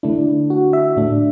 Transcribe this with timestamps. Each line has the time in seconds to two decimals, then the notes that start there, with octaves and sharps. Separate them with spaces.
0.03 D3 A3 D4 E4
0.50 F#4
0.73 E5
0.97 A2 A3 D4